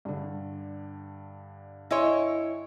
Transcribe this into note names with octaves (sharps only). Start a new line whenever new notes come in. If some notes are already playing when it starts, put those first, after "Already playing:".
G2 D3
E4 C#5 D#5 G#5 C6